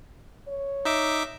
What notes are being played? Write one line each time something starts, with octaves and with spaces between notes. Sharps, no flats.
C#5
D#4 E5 D6